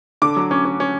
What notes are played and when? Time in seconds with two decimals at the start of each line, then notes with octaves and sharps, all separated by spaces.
0.22 D3 D6
0.36 F#3
0.51 C#4
0.65 C#4
0.80 C#4